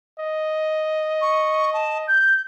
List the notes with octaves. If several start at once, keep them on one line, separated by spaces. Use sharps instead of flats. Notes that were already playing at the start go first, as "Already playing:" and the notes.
D#5
C#6
A5
G6